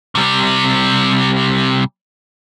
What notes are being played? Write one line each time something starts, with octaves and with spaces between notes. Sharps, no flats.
C3 G3